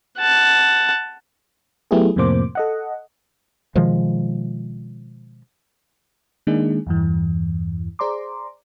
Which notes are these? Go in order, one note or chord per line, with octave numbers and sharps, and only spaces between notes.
F#5 A5
F#3 A3 B3 E4 G4 G#4
F2 A2 C3 A#3 C5 D6
A4 D#5 F#5
B2 D#3 F3 G#3
D#3 G#3 A#3 D4 D#4 G#4
E2 G2 E3
G#4 C5 D5 A#5 C6 D6